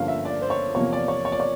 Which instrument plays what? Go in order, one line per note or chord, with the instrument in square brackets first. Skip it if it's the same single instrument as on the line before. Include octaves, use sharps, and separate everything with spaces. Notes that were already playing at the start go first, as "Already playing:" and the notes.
Already playing: [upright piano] G2 D3 F3 A#3 C#4 F5
E5
D5
C5
C#5
E2 C3 F3 A#3 C#5
D5
C#5
C#5
D5
C#5